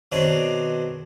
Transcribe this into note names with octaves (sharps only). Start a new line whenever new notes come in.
B2 D#3 C4 D4 G#4 C#5